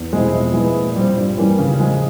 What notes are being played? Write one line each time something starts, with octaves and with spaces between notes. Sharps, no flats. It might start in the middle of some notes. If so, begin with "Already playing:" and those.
Already playing: E2
B2 G#3 C4 E4
F3
G#3 B3 E4
A#2
G3 C4 F4
G2
E3 G3 A#3 C#4
C#3
F3 G#3